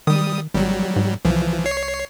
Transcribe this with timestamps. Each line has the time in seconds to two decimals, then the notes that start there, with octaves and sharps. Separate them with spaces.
0.07 D#3 G3 D#6
0.54 G#1 F#3 G3
0.96 G#2
1.25 C2 E3 F3
1.66 C#5 C7